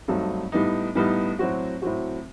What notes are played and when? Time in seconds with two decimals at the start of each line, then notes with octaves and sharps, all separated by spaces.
0.08 G2 F#3 A3 C4 D#4
0.52 A2 G3 B3 D#4
0.95 A2 G3 B3 D#4
1.39 A2 F#3 C4 F#4
1.82 A2 F#3 C4 F#4